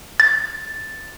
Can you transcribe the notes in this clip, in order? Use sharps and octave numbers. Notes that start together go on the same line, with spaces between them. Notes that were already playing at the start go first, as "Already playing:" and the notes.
A6